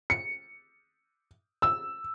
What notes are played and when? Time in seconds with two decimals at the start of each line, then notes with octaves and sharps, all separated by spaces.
0.10 C#7
1.62 E6